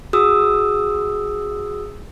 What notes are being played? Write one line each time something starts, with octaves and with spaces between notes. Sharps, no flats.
F#4 G#4 D#6 E6